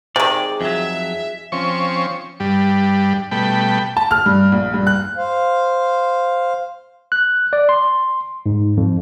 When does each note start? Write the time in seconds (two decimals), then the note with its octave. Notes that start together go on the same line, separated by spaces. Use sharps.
0.16 C3 D#3 G#3 G#4 D5
0.61 F2 F#3 E5
1.52 F3 C4 C#4 C#6
2.40 G2 G3
3.31 B2 G3 A3 G5 B5
3.97 A5
4.11 F6
4.26 G2
4.52 A#1
4.74 G2
4.87 F#6
5.17 C5 F5
7.12 F#6
7.53 D5
7.69 C6
8.46 G#2
8.77 F2